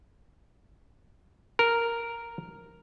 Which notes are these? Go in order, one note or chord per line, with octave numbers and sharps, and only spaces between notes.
A#4